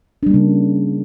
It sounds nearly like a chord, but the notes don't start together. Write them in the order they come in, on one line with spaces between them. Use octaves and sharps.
D4 G3 A#3 C#3